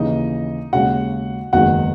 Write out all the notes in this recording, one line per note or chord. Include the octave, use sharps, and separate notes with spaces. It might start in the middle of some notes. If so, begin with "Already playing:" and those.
Already playing: D#2 C#3 E3 D#4 D#5
D#2 C#3 G#3 C#4 F#4 F#5
F#1 E2 D#3 G#3 F#4 F#5